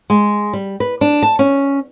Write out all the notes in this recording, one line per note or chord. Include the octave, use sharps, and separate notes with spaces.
G#3
G3
B4
D4
A5
C#4